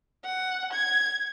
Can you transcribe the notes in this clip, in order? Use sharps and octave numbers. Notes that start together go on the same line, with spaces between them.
F#5
G#6